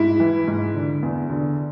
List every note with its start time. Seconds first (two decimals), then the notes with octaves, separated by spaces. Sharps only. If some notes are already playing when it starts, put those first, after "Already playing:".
Already playing: G#2 E4
0.20 E3
0.47 G#2
0.75 D3
1.03 E2
1.30 D3